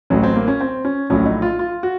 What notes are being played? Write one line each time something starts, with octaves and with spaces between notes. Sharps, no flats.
A1 A2 F#3 C#4
C4
A#3
C#4
C4
C#4
A#1 A2 F#3 C#4
D#4
F4
F4
F#4